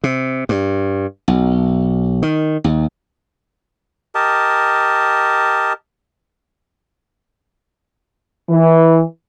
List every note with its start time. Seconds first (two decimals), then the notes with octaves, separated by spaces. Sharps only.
0.04 C3
0.49 G2
1.28 B1
2.22 D#3
2.64 D#2
4.15 G4 A#4 D#5 A5
8.49 E3